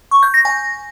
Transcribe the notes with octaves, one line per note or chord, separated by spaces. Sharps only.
C#6
G6
A#6
G#5